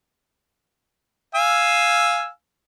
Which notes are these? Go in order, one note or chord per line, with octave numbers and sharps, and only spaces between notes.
F5 G#5 E6